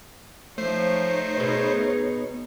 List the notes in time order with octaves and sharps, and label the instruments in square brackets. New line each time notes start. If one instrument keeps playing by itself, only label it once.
[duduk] F3 [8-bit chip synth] A3 C5 C7 [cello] D#4 C#5
[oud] B2 B3 [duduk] G#4